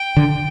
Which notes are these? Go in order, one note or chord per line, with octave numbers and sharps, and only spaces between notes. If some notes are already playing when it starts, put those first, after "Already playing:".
Already playing: G5
D3